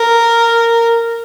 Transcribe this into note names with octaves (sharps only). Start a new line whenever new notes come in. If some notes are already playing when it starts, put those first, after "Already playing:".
Already playing: A#4